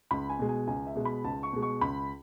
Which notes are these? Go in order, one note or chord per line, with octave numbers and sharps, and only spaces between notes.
C#2 B5
G#5
B2 G#3
G#5
C#2 G#5
E5
B2 G#3
B5
C#2 A5
C#6
B2 G#3
C#6
C#2 B5